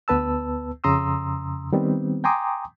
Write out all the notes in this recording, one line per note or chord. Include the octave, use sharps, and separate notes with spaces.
D2 B3 B4 A5 E6
F2 C#3 A#5 C6 D#6 E6
D#3 G3 B3 C4
G5 G#5 A#5 C6 D6 D#6